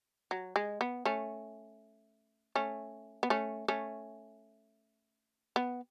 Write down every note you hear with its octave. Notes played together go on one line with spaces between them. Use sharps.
F#3
G#3
B3
A3 C#4
A3 C#4
B3
A3 C#4
A3 C#4
B3